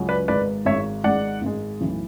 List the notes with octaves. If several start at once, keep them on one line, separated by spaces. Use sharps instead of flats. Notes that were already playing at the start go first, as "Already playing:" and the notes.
Already playing: C#2 C#3 F#3
B4 D5
G#1 G#2 G#3 B4 D5
G#1 G#2 G#3 C#5 E5
G#1 G#2 G#3 D5 F#5
G#1 G#2 G#3
B1 A2 E3